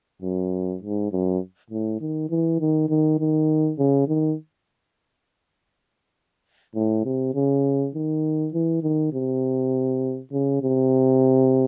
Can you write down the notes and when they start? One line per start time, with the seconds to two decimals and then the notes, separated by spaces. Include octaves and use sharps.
0.22 F#2
0.82 G#2
1.12 F#2
1.70 A2
2.01 D#3
2.30 E3
2.60 D#3
2.89 D#3
3.19 D#3
3.78 C#3
4.08 D#3
6.75 A2
7.05 C3
7.35 C#3
7.95 D#3
8.53 E3
8.83 D#3
9.13 C3
10.32 C#3
10.62 C3